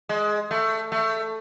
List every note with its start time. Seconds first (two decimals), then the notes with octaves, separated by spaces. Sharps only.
0.09 G#3
0.51 A3
0.92 A3